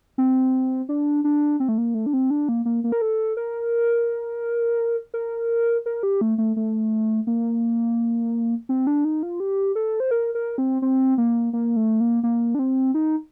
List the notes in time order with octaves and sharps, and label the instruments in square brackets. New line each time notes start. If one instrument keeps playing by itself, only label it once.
[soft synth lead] C4
D4
D4
C4
A3
A#3
A3
D4
C4
D4
A#3
A#3
A#3
A#4
A4
A#4
A#4
A#4
G4
A3
A3
A3
A#3
C4
D4
D#4
F4
G4
A4
C5
A#4
A#4
C4
C4
A#3
A#3
A3
A#3
A#3
D4
C4
D#4